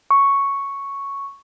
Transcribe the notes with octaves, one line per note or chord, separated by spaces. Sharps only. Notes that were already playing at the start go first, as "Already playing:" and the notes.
C#6